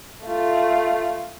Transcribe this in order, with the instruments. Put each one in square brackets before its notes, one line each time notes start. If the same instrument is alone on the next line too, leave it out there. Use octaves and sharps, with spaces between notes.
[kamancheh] A3 F4